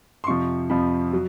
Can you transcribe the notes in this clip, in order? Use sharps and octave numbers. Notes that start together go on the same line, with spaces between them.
C6
F2 C3 F3 C#6
F2 C3 F3 B5
F#3